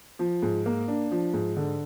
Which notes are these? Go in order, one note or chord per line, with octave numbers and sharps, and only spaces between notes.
F3
G#2
A#3
D4
F3
G#2
D3